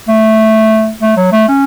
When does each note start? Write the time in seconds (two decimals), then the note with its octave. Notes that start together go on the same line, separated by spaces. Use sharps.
0.08 A3
1.02 A3
1.17 F#3
1.32 A3
1.48 C#4